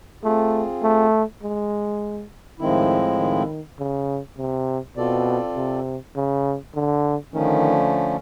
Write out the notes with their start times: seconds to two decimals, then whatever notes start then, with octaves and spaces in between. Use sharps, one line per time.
0.23 A3 C4 F4 G#4
0.83 A3
1.42 G#3
2.60 A2 D#3 F3 G#3 C4 E4
3.19 D#3
3.79 C#3
4.38 C3
4.97 B2 C4 F4 A4 D5
5.56 C3
6.16 C#3
6.75 D3
7.33 D3 D#3 F3 A3 C#4